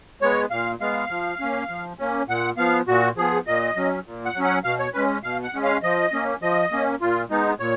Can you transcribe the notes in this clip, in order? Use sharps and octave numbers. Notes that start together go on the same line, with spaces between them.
G#3 B3 C#5
A#2 F5
G#3 B3 F5
F3
A#3 C#4
F3
A#3 C#4
A#2 F#5
F3 B3 F5
A#2 F#4
F3 B3 G#4
A#2 D#5
F#3 C#4
A#2
F#5
F#3 C#4
F#5
B2 F5
C#5
G#3 C#4 B4
B2 F5
F#5
G#3 C#4
F5
F3 D#5
A#3 C#4
F3 D#5
A#3 C#4
A#2 F4
G#3 B3 D#4
A#2 C#5